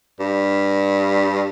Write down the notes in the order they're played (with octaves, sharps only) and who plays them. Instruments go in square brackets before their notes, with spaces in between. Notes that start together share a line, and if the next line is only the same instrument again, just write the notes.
[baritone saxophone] G2